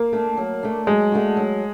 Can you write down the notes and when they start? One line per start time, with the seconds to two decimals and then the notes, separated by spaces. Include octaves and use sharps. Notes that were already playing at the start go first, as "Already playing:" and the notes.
Already playing: A#3
0.13 A3 D4
0.37 F#3
0.63 A3 D4
0.87 F#3 G#3
1.12 A3 D4 F#4
1.37 F#3